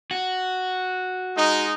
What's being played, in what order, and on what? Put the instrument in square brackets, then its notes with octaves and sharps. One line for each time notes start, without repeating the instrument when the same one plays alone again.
[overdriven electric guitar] F#4
[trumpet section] G#3 D#4